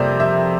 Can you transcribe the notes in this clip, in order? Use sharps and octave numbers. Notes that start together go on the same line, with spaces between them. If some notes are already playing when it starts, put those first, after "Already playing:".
Already playing: F2 C3 G3 A#3 C5 D5
E5